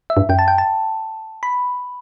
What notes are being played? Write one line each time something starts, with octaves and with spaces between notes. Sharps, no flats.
E5
G2
F#2 G5
A5
G5
A5
B5